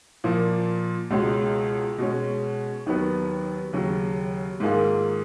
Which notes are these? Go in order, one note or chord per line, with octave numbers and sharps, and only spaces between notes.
A#2 F3 A#3
C#2 B2 G#3 C#4
B2 G#3 C#4
D#2 D#3 F#3 B3
D#2 C#3 F#3
G#2 D#3 A#3 F4 G#4